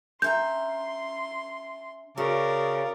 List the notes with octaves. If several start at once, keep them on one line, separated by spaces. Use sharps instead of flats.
C#4 E5 A#5 C6 G6
C#3 F#4 A#4 D5